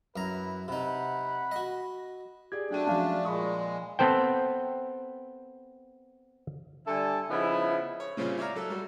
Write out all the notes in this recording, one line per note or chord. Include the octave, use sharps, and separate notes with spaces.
F#2 E4 B4 A#5
C3 D#4 F#5 B5
F#4 D#5
G4 G#4 D5 G#6
F#3 A3 D4 G5 D#7
F3 F#3 G#3 C#4 F5 A5
A#2 G#3 B5 C#6 D#6
B3 C4 A4 C5 G5
D3 G3 A4 E5 G#5 A5
C#3 F3 B3 D#4 E4
C#5
A#2 C#3 G3 C4 C#4 F4
E4 C#5 D5 F5 A#5
F#3 A4 E5
G3 F#4 A4